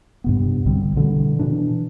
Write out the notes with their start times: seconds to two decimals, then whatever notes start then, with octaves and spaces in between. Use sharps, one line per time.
0.24 G2 C3 B3
0.65 B1 D3 G3 C4
0.96 B2 D3 E3 G3
1.39 B2 E3 D4